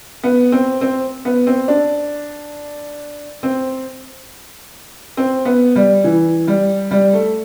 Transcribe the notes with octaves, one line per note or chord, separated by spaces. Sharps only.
B3
C4
C4
B3
C4
D4
C4
C4
B3
G3
E3
G3
G3
A3